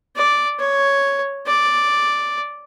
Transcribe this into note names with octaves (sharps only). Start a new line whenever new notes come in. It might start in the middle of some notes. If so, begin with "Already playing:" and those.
D5
C#5
D5